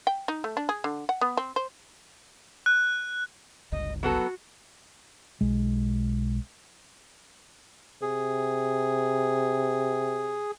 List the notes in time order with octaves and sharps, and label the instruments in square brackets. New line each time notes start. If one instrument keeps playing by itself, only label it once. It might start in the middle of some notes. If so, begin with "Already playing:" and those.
[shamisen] G5
D#4
A3
D4
G#4
D3
F#5
B3
C4
C5
[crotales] F#6
[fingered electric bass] G1 C#2 G2 [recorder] D#5
[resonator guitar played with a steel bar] F#3 B3 A4 [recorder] F#4
[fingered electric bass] B1 G#3
[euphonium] C3 [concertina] G#4